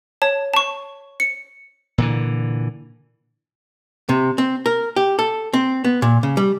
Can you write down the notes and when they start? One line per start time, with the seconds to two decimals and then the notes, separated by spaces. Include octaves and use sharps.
0.22 C#5 A5
0.54 A5 C#6
1.20 C#7
1.98 A#2 D3 E3
4.09 C3
4.38 C4
4.66 A#4
4.96 G4
5.19 A4
5.53 C4
5.84 B3
6.02 A#2
6.23 C#3
6.37 G3